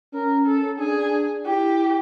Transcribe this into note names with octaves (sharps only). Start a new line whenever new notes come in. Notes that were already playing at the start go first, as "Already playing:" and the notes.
C#4 A#4
A4
D4 G#4
E4 G4